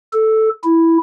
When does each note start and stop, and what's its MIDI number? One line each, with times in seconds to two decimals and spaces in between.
0.13 0.49 69
0.64 0.98 64